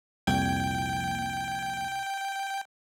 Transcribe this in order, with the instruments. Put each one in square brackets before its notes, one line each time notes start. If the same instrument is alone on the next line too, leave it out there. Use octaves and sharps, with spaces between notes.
[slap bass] C2 [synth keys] F2 A#2 G#6 [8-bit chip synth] G5